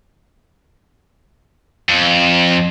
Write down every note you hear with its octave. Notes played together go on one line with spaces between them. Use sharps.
F2